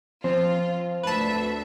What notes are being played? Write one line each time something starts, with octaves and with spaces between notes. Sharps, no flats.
F3 C4 F4
D2 B4 E5 A5